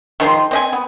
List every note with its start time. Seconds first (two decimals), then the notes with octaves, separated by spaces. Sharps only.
0.20 D#3 F3 G#3 C6
0.51 C4 D#5 G#5
0.73 B3